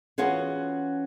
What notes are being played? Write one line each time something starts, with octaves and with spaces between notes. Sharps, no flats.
E3 B3 C#4 F4 F#4 G#4